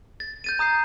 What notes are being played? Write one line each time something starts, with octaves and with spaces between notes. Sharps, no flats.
A6
G6 A6 D#7
A#5 D#6 G6 C7